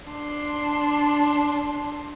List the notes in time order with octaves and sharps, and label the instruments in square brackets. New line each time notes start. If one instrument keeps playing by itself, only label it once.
[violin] D4 C6